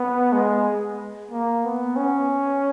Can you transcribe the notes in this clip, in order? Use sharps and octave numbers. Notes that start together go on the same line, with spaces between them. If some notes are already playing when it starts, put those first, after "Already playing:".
Already playing: B3
G#3
A#3
B3
C#4